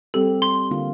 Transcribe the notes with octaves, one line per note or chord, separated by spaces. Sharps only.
G3 C4 G4 A4
C6
D3 A#3 F4